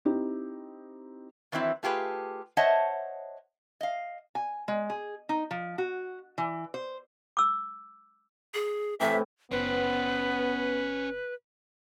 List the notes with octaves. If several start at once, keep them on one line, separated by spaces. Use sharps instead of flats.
C4 D#4 E4 G4
D#3 E3 F#3 C4 E4
A3 F4 G4 G#4 B4
C5 C#5 D#5 E5 F#5 A5
D#5 F5
G#5
G#3
G#4
D#4
F3
F#4
E3
C5
D6 E6
G#4
A2 C3 E3 E5
F#1 B3 C#4 B4 C5